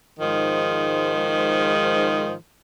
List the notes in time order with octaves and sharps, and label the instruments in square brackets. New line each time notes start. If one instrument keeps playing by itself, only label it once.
[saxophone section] G#2 D#3 F3 G#3